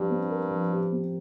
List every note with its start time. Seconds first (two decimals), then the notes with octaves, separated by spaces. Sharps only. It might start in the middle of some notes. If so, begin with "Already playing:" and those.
Already playing: G2 F3 C4 G4
0.10 C4
0.30 A#4
0.51 F3
0.72 G4
0.92 C4